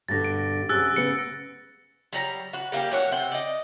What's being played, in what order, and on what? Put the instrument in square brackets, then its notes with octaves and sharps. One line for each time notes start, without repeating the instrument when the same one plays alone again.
[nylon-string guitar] G2 B2 D3 [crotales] A6 A#6
[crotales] D7
[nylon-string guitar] F#2 C3 G#4 [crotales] E6 F#6 A6
[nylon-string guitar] C#3 B3 [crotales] C#7
[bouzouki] F#3 G3 A#5
F#4 B4
G3 A#3 G4
F#3 A3 C#5 F#5
C3 F#5 G5
D5 D#5